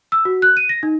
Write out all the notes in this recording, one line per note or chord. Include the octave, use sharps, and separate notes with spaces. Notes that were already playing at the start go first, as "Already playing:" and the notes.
E6
F#4
F#6
D#7
A#6
D#4